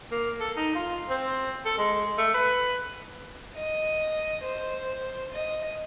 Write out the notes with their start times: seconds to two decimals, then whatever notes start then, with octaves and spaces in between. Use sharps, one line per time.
0.11 A#3
0.40 A4
0.57 D#4
0.75 F4
1.09 C4
1.65 A4
1.78 G#3
2.18 A3
2.34 B4
3.56 D#5
4.43 C5
5.33 D#5